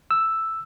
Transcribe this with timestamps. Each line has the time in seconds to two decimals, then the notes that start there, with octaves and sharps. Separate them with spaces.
0.11 E6